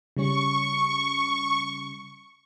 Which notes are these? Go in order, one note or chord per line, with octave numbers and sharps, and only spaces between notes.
C#3 G3 C#4 C#6